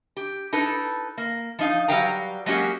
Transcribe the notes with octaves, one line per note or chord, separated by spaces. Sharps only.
G4
D#4 E4 A4 B4
A#3
F3 D#4 F5
F#3 G3 B4 F5 G5 A#5
F#3 G#3 A#3 C#4 F#4 G4